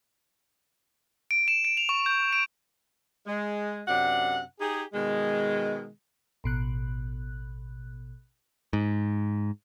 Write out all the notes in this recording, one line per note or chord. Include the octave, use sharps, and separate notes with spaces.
D7
E7
D7
F7
C#6
G6
D7
G#3
F#2 C3 D4 F#5
D#4 G4 G#4
B2 D#3 G#3
A1 B2 F#6
G#2